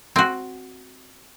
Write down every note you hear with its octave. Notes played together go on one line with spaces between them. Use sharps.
C4 F#4